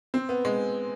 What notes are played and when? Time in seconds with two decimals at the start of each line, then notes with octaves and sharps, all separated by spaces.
0.14 C4
0.29 B3
0.45 G#3